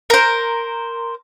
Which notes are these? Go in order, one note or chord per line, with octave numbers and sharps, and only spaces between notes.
A#4 C5